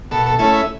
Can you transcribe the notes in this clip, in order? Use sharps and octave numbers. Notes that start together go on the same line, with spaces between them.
B2 A4
A4
A3 C#4 E4 A4
E5